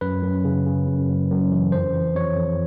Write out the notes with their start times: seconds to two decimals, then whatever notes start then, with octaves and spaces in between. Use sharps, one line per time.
0.01 F#2 B4
0.22 F#2
0.45 C#3
0.66 C#3
0.87 F#2
1.09 F#2
1.30 F#2
1.52 E3
1.72 F2 C5
1.94 E3
2.15 F2 C#5
2.36 F2